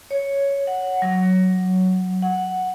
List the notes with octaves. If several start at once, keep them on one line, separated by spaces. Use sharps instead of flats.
C#5
F#5
F#3
F#5